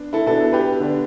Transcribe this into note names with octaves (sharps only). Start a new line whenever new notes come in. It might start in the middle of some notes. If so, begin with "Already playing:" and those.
Already playing: B3 D4
E4 A4
B2 B3 D4 E4 A4
G4 B4
D3 B3 D4